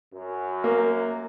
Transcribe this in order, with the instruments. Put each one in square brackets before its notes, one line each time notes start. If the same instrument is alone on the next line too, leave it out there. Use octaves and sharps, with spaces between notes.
[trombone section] F#2
[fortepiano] A#3